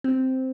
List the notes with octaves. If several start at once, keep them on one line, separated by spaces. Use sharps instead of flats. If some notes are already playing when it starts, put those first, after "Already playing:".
C4